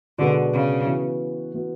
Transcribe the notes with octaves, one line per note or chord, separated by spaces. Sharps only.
B2 D3 G#3 B3 D4 F#4
C#3
E3 B3 F#4
E3 B3 F#4